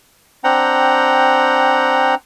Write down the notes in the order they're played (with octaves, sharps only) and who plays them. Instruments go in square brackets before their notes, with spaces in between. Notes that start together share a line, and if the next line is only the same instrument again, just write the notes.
[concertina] C4 D4 F#5 G5 A#5